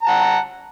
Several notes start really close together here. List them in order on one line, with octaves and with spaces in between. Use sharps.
A#5 A5 F#5